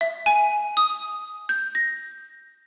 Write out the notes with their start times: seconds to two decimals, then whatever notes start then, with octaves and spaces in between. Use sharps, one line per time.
0.01 E5
0.26 G#5
0.77 D#6
1.49 G6
1.75 A#6